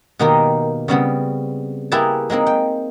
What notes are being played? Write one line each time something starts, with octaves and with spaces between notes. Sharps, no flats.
B2 D#3 A#3 D#4 G4 A#4
C#3 G3 B3 C4
A#3 E4 G4 G#4 B4 A5
G#3 A#3 C4 D#4
G5